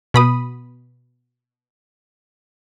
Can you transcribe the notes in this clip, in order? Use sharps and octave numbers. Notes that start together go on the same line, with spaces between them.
B2 B5 D#6